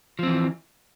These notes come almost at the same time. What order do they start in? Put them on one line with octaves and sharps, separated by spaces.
F3 C4 E3